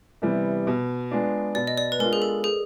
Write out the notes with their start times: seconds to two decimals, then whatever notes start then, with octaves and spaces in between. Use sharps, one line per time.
0.22 C3 E3 G3 B3
0.67 B2
1.11 G#3 B3 D4 F4
1.55 B2 D5
1.67 D#5
1.78 D5
1.92 B4
1.99 G#3 B3 D4 F4 A#4
2.13 G#4
2.22 A4
2.44 G#4